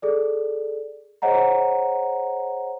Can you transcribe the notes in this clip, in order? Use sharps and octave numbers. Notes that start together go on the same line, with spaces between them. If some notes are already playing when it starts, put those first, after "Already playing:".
G#4 A4 D5
G#4 C5 C#5 D#5 F#5 A#5